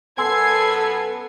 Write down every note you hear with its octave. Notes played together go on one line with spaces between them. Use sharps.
F#2 B3 A4 G#5 C6 E6 G#6 C7